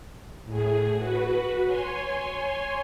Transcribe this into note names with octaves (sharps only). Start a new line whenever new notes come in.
A2 G#4
F#4 B4
C#5 G#5 C6